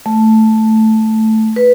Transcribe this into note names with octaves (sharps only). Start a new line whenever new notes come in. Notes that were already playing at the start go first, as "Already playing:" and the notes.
A3
B4